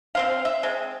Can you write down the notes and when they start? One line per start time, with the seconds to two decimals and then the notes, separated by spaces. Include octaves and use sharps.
0.15 C4 C5 F5
0.45 E5
0.63 G#3 C4